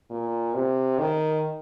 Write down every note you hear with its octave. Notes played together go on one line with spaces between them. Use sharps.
A#2
C3
D#3